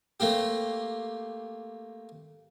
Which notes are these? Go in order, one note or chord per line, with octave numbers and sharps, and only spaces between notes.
A3 A#3 C4 G4